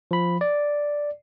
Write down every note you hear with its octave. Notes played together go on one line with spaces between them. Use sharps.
F3 B5
D5